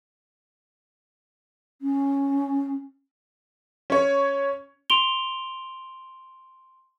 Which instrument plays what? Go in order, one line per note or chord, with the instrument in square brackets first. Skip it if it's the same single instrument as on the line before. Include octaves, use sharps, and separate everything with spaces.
[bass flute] C#4
[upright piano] C#4 C#5
[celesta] C6 D7 F7 G7